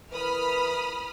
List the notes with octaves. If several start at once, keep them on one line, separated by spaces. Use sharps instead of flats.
E3 A#4 B4 B5 D#6 F6